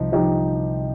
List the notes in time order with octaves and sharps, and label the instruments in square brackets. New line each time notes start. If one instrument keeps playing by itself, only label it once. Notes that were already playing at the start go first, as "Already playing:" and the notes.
Already playing: [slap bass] C2 C3 [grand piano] F3 D#4
[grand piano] F3 D#4 G4